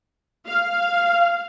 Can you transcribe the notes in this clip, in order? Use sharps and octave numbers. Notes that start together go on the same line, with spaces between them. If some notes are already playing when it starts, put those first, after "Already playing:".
F5